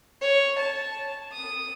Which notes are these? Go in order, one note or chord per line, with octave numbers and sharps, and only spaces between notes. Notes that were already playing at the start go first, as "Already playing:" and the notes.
C#5
A5
D#6